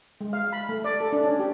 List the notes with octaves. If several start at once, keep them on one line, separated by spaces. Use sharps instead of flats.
G#3
F5
B5
A3
D5
A4
D4
C#4
G4